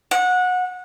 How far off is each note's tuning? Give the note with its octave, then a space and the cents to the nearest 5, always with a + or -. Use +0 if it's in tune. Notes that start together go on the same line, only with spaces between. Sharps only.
F#5 -20